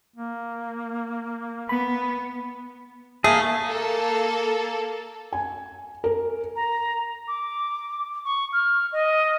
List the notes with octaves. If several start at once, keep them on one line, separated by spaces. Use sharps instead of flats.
A#3
B3 B5
A3 A#3 G#4
A#3 A4
G#5
A#4
A#5
D6
C#6
F6
D#5